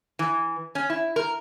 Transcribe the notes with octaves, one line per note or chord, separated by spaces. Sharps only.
E3
C#4
E4
A#4